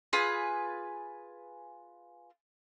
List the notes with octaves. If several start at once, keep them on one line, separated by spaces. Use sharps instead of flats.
F4 G#4 B4 G#5